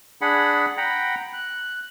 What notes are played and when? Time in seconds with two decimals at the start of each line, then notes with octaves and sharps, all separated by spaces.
0.21 D4 G#4 F#5 B5
0.77 F#5 G5 A#5 B5
1.33 F#6